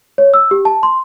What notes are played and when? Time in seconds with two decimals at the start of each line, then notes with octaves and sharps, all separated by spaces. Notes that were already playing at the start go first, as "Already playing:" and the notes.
0.18 C#5
0.34 E6
0.51 G4
0.65 A5
0.83 C6